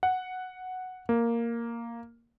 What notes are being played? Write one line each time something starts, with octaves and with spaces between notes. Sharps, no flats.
F#5
A#3